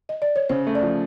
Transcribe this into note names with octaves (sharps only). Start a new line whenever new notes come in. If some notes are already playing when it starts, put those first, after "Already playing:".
D#5
D5
C#5
C#3 C5
A3
D5
F3